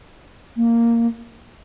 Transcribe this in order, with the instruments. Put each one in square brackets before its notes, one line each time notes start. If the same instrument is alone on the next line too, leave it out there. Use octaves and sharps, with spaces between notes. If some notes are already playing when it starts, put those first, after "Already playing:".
[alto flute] A#3